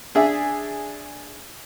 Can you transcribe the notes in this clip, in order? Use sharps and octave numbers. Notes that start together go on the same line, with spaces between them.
D4 G#4 E5